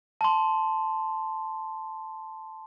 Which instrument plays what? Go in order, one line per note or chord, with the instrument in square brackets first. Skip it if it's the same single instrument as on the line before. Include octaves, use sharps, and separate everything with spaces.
[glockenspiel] A5 C6